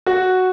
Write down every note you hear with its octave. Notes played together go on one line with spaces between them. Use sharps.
F#4